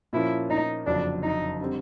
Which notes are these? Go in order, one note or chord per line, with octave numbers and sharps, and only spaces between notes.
A#2 F3 A#3 C#4 E4 F4
D#4
F#1 F2 D3 F#3 D4
D#4
D3 G3 C4